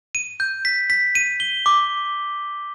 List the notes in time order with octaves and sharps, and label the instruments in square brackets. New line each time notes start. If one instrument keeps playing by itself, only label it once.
[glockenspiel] D#7
G6
B6
B6
D#7
G7
D6